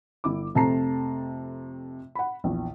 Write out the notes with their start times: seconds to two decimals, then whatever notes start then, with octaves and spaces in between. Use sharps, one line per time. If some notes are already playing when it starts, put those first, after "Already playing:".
0.24 G1 E4 D6
0.55 F2 C3 A3 A5 A#5 C7
2.15 F#5 B5
2.44 A#1 E2